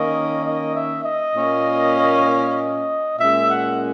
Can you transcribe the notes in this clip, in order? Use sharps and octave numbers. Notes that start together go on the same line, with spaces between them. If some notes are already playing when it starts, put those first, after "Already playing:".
Already playing: D#3 A#3 C#4 D#5
D#5
E5
D#5
A#2 A#3 C#4
D#5
A#2 G#3 C#4 E5
F#5